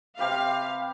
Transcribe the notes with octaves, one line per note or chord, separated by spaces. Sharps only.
C3 G4 B4 F5